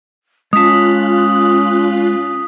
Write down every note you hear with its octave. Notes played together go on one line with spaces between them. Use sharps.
G#3 C#4 F4 A5 D#6 F#6 B6